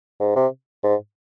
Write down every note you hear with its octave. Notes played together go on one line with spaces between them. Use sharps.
G#2
C3
G#2